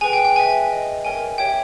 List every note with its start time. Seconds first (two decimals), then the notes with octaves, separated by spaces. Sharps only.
0.01 G#4 B4 G5 G#5
0.13 G5
0.25 G5
0.36 G#4 B4 E5 G#5
0.70 G#4 D#5 G5
1.05 A#4 C#5 E5 G5 G#5
1.38 G4 C#5 E5 G5